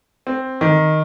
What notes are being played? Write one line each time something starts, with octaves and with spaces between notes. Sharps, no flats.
C4
D#3